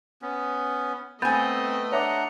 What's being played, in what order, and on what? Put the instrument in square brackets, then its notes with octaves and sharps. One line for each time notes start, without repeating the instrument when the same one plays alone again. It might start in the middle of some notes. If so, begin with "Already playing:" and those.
[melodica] B3 C#4
[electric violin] A3 D#5 [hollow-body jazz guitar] B3 G#5 [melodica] C4 [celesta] B5 G6 A6
[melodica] D4 F#5 A#5 [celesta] C#5 E5 D6